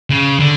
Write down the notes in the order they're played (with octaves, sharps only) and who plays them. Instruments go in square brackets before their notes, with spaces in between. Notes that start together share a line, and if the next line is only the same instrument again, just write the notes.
[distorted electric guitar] C#3
D3